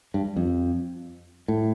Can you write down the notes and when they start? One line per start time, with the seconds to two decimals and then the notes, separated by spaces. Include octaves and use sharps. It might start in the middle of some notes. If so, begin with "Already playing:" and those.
0.14 G2
0.36 F2
1.48 A2